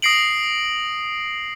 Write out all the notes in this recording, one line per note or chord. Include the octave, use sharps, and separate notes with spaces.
D#6 A#6 C7 D7 F#7